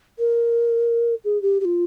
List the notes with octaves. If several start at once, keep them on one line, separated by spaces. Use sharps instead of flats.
A#4
G#4
G4
G4
F4